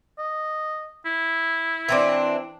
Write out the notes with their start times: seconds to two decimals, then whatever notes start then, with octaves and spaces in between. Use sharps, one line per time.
0.19 D#5
1.06 E4
1.88 E3 C4 D4